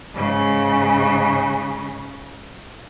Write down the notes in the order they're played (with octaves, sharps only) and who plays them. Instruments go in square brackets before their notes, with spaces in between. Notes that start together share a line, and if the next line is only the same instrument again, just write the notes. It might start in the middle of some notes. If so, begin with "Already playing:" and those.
[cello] G#2 C#3